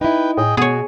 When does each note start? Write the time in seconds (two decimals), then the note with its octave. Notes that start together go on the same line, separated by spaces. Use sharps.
0.01 D#4 E4 B4 G5
0.37 A2 G#4 D#5 G5
0.57 B2 B3 F#4 G#4 C#5